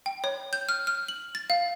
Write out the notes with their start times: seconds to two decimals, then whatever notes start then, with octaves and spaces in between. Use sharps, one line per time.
0.06 G5
0.24 C#5
0.53 G6
0.69 F6
0.87 F6
1.08 F#7
1.35 A6
1.50 F5